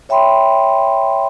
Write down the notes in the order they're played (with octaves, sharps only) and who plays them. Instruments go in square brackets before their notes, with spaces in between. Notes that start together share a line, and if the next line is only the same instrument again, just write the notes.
[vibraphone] C#5 E5 G5 B5 C6